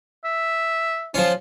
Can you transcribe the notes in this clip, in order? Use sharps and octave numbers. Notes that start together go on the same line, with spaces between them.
E5
F3 C#4 F4